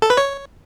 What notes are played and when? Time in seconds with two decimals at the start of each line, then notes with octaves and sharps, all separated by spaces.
0.02 A4
0.10 B4
0.17 C#5